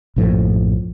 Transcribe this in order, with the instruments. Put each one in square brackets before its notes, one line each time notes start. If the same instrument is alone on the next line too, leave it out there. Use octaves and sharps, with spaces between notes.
[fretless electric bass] A#1 F#2 A2 F3